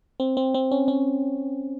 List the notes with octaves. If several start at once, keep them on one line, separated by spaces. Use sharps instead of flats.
C4
C4
C4
C#4
C#4